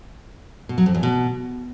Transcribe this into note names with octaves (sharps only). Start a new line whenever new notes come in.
B2
F#3
F2
E2
B2